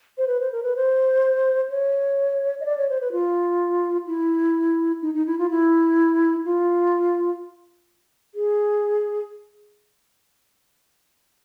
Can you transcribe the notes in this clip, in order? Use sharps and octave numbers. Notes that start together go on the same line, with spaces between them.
C5
B4
C5
A#4
B4
C5
C#5
D#5
D5
C#5
C5
B4
F4
E4
D#4
D#4
E4
F4
E4
F4
G#4